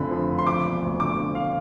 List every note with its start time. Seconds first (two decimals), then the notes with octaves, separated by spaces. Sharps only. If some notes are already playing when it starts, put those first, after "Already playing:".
Already playing: F1 F2 D3 F3 B5
0.11 F3
0.29 F1
0.39 C6
0.47 F3 D6
0.65 E1
0.82 D2
1.00 D3 D6
1.17 F3
1.35 F5